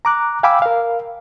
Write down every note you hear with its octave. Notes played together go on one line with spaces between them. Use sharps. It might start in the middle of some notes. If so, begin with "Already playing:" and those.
A#5 D6 F#6
F5 G5 G#5 B5 D6 E6
A#4 F5